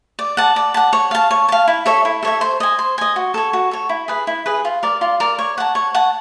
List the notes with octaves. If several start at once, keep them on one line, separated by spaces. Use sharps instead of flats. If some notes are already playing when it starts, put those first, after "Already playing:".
D5
F#5 A5
D5
F#5 A5
C#5
F5 A5
C#5
F5 A5
E4
A4 C#5 E5
E4
A4 C#5 E5
C5
D#5 G#5
C5
D#5 G#5
F#4
A4 C#5
F#4
A4 C#5
E4
G#4 B4
E4
G#4 B4
F4
A#4 D5
F4
A#4 D5
C#5
F#5 A5
C#5
F#5 A5